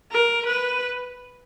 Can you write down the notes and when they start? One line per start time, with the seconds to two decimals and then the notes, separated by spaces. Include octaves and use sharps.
0.12 A#4
0.47 B4